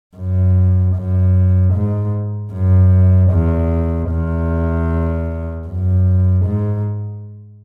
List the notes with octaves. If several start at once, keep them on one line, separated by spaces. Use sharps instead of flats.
F#2
F#2
G#2
F#2
E2
E2
F#2
G#2